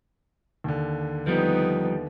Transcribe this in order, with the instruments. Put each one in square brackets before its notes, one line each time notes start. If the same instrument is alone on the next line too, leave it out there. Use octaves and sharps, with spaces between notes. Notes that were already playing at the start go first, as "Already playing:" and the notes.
[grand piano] D#2 D3
[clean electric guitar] F3 G3 [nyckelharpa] B3 D#4